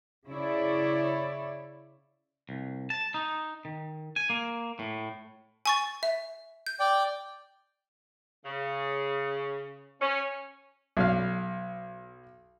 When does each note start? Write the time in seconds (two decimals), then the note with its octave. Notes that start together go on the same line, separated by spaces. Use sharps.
0.27 C#3 E4 C#5 D5
2.49 C2
2.90 A5
3.14 D#4
3.65 D#3
4.16 G#5
4.30 A#3
4.79 A2
5.66 G#5 C#6 A6
6.03 E5
6.67 G6
6.80 D5 G5
8.45 C#3
10.01 C#4
10.97 B1 F5